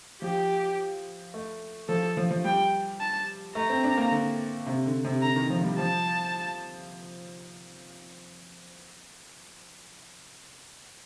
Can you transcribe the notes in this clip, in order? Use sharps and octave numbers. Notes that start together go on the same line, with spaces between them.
F3 G4
A3
F3 A4
F3
F3
G3 G5
A5
A3 A#5
C4
D4
A#3
D3
C3
D3
C3
D3 A#5
D#3
F3
F3
G3
F3 A5